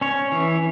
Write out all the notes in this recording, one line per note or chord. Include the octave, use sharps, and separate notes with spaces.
C#4 C#5
E3